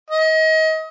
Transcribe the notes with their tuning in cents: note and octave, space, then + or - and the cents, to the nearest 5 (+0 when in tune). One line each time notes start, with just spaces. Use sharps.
D#5 +30